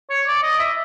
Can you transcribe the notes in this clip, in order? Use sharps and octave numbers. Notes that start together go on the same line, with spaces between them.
C#5
D5
D#5
E5